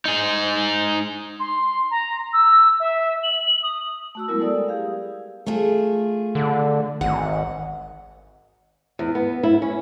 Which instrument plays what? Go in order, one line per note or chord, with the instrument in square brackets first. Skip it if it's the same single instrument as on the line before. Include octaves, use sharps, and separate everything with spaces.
[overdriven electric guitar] D#4 G#4
[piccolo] C6
A#5
E6
E5
F#7
D#6
[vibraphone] A3 F#4 E6
F#3 G#3 A3 B3 E4 A#4
G3 A4 D5 D#6
G4 G#4 F5
[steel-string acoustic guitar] A3 F4 G#4
[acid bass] D3
[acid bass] G#1 [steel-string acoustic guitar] F#5
[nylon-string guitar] E2
B3
E4
C#4